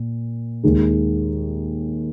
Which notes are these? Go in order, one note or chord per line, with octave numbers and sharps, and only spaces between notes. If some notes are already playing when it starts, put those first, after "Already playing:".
Already playing: A#2
D#2 D#3 G#3